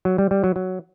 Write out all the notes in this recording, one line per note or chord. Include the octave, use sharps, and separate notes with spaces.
F#3
G3
G3
F#3
F#3